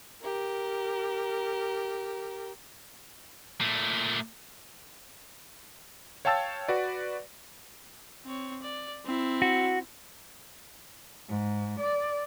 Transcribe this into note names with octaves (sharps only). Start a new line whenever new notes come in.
G4 A#4
A#2 A3
C#5 F5 G5 A5 E6 A6
F#4 B4 D5
C4 C#5
D5
C4 E4
F#4
G#2
D5